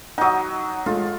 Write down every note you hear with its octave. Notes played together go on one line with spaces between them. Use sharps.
F#3 D#4 F#5 D#6
G#3 A3 F4